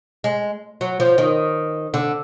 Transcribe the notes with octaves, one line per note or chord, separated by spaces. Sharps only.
G#3
F#3
F3
D#3
D3